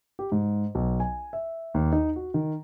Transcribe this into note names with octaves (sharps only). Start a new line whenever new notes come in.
G4
G#2
B1
G#5
E5
D#2
D#4
F#4
D#3